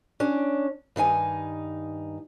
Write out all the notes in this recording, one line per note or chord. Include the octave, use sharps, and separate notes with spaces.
C#4 D4
G2 D#3 D#4 G#5